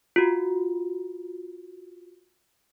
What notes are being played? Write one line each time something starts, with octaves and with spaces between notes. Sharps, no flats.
F4 F#4